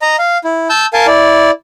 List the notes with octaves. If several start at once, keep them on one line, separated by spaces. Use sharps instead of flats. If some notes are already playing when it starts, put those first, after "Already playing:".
D#5 A#5
F5
E4
A5 E6 G6
A#4 F5 G#5 A5
E4 D5